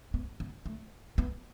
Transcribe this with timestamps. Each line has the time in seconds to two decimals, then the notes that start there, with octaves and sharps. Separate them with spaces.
0.14 B3
0.40 B3
0.66 A3
1.18 B3